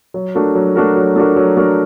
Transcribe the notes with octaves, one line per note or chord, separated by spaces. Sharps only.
F#3
A3 D4 F#4 A#4
F#3
A3 D4 F#4 A#4
F#3
A3 D4 F#4 A#4
F#3
A3 D4 F#4 A#4